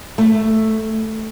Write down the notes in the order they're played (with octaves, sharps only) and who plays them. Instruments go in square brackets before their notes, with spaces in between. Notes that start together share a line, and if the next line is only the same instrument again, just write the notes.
[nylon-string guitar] A3